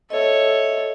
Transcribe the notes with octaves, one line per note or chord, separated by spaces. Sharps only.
A4 C#5 D#5 E5